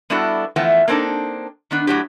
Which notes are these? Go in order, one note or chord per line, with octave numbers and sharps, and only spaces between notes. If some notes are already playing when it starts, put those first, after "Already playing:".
G3 B3 D4 E4 F#4 A4
E3 F3 A3 B3 G5
A#3 C4 D4 D#4 A4
D#3 B3 D4
A2 F#3 G4